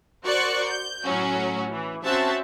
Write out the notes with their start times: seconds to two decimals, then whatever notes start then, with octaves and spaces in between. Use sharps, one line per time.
0.25 F#4 A#4 C5 D5 C#6 F#6
0.67 G6
1.04 A2 F#3 C#4 F#4
1.71 E3
2.05 C4 C#4 F#4 C5 E5 A5